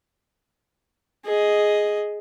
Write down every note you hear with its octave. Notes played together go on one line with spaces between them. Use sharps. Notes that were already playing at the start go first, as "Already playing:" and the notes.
G#4 D#5